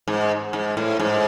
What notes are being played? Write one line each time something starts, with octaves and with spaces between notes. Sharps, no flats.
G#2
G#2
A2
G#2